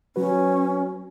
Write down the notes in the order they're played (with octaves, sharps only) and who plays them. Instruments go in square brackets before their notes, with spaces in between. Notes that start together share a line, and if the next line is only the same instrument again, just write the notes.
[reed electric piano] F#3 F#4 B4 [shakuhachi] C#4